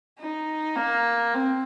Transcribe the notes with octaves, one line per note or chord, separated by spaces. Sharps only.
D#4
A#3
C4